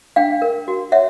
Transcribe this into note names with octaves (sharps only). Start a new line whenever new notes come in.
D4 F5 G5
A#4
F#4
C#5 E5 F#5